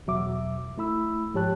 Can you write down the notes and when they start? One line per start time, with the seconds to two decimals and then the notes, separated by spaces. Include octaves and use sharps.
0.07 E2 B2 F#3 E5 D6
0.77 A3 E4 B5 E6
1.34 G#2 F3 G4 C#5 A5 F#6